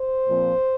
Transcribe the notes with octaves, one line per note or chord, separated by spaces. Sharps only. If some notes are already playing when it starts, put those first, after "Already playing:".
Already playing: C5
A#2 F3 C4